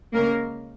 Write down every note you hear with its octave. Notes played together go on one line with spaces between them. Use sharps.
C#3 G#3 A#3 C#4 A#4